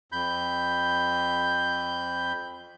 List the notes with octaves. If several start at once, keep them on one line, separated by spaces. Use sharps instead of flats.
F2 B5 G6